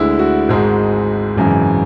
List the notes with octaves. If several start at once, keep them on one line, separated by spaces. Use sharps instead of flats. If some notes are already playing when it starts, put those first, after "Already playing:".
Already playing: D2 D3 G#3 E4
F#4
G#1 G#2 G#3
G#1 F#2 C#3 E3